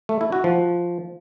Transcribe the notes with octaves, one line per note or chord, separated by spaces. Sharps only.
A3
E4
F#4
F3